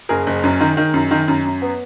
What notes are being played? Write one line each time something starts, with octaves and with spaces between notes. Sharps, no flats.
F#1 G#4 A#4
F#1
F#2
D#3
D#3
F#2
D#3
F#2
F#2
B3